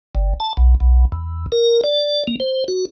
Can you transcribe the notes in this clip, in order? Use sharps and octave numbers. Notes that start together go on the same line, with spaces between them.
G1
A5
B1
B1
E2
A#4
D5
A#3
C5
F#4